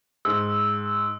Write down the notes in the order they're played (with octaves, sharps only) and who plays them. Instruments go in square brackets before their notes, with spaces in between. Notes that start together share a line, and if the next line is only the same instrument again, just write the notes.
[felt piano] G#2 [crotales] E6